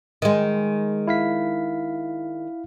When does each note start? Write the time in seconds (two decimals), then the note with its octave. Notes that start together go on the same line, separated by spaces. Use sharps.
0.22 D#3 G#3
1.07 E4 F5 B6